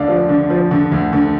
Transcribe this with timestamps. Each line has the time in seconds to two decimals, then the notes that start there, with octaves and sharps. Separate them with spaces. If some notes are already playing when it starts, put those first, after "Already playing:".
Already playing: D2 D3 D5 F5
0.08 F3
0.29 D3
0.50 F3
0.71 D3
0.92 D2
1.13 D3